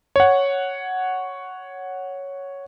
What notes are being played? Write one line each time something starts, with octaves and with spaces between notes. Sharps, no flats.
C#5 F#5